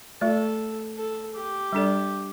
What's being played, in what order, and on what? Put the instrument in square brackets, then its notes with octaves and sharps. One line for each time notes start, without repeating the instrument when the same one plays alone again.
[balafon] A3 F4 D5 [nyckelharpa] A4
[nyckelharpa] A4
G4
[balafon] G3 D4 A4 D5